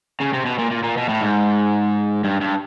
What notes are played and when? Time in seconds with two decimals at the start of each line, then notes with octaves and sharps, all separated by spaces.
0.20 C#3
0.33 C3
0.45 B2
0.58 A#2
0.71 A#2
0.83 A#2
0.97 B2
1.09 A2
1.21 G#2
2.24 G2
2.41 G2